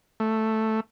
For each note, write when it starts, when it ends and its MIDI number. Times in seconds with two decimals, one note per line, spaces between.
0.20 0.80 57